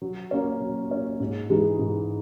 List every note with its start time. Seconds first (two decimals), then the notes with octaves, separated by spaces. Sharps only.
0.02 F#3
0.31 A#3 C#4
0.61 F#3
0.90 A#3 C#4
1.20 G#2
1.50 E3 G#3 D#4 G#4
1.79 G#2